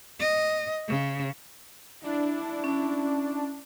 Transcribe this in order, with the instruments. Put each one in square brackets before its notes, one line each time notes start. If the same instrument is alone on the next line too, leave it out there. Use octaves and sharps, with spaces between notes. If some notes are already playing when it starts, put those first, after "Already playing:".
[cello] D#5
C#3
[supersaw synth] D4 [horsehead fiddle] E4
[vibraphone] C#4